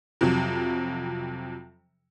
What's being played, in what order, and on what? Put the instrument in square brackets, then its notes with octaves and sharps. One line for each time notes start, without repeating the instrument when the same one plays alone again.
[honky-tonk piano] F2 C3 F#3